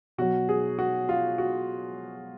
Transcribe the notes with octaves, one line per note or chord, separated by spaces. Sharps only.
B2 F#3 F#4
G#4
F#4
F4
F#4